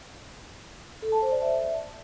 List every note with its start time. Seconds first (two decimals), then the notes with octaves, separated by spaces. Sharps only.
1.02 A4
1.12 A5
1.22 C5
1.32 D5
1.42 E5